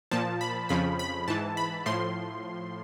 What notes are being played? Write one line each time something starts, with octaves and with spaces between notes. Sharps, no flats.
A#2 F3 A5
B5
F2 C#3 F3 B5
B5
G#2 E3 A5
B5
A2 F3 C6